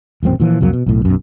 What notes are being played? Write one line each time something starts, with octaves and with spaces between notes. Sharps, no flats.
D#1 A1 F#2 C4
A#2 E3 F3
C2 F2 F#3 A#3
B2
B1 A2
B1 F#2